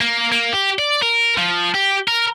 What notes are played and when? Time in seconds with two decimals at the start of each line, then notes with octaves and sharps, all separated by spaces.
0.01 A#3
0.32 A#3
0.53 G4
0.79 D5
1.02 A#4
1.37 F3
1.74 G4
2.08 A#4